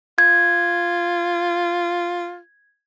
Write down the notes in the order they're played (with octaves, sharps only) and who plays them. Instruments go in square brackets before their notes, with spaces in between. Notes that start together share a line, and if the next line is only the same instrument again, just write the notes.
[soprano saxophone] F4 [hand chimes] G#6